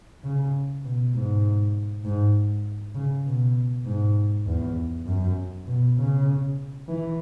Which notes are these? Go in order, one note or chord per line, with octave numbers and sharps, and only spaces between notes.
C#3
B2
G#2
G#2
C#3
B2
G#2
E2
F#2
B2
C#3
E3